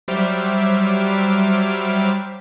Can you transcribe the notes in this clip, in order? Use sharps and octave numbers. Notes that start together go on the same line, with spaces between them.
F#3 G3 C5 E5 D6 F6